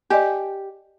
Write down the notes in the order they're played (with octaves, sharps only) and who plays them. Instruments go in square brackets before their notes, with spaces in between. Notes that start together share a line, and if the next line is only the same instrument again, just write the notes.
[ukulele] G4 [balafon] D5 D#5 G#5